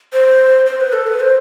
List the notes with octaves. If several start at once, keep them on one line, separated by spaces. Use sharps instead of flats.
C5
C5
B4
A4
B4
C5